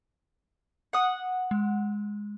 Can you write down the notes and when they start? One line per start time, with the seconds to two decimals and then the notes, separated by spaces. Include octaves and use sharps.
0.93 F#5 D#6
1.51 G#3